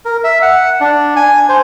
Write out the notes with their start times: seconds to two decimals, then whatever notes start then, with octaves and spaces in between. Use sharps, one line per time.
0.05 A#4
0.24 E5
0.42 F#5
0.81 D4
1.16 G#5
1.49 C5